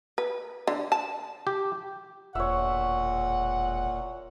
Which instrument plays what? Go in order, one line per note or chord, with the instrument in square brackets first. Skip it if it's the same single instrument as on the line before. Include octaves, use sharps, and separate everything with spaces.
[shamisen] B4
D3
A5
[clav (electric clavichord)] G4
[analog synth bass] E1 [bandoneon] A#2 [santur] C#5 E5 [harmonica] F#5